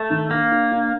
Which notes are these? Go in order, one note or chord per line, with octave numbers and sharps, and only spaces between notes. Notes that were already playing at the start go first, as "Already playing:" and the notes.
Already playing: A3
D#3
A#3 D4
D4
D4